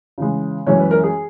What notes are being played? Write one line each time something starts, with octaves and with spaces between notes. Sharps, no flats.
C#3 E3 G#3
F#2 E3 G#3 C#4 C#5
B4
A#4
G#4